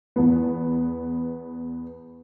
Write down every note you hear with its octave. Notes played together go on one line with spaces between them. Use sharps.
E2 B3